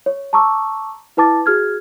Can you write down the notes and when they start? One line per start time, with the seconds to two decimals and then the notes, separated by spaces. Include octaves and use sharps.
0.06 C#5
0.33 A5 A#5 C#6 D6 E6
1.17 E4 B4 A5 D6 A6
1.46 F#4 G#4 F6 G#6